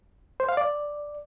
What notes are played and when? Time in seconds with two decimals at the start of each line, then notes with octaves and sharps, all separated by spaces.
0.40 C5
0.49 F5
0.57 D5